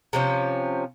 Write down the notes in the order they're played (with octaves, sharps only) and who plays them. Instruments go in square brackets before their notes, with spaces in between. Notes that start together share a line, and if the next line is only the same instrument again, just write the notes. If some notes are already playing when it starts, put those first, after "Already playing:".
[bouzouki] C3 F3 C#4